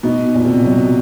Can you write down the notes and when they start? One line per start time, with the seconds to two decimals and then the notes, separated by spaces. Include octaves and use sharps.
0.03 B2 D#4
0.35 A#2
0.45 C3
0.66 F#3